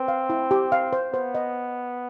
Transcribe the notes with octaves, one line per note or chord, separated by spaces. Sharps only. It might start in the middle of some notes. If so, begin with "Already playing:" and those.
Already playing: C4 B4
F5
E4
G4
F5
C5
B3 C5
D#5